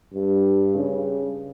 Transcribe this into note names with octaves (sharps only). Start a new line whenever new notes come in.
G2
C#3